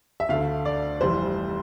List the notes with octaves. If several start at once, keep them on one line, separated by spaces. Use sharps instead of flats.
E5
D2 D3 A3 F5
D5
F1 F2 E3 G3 C5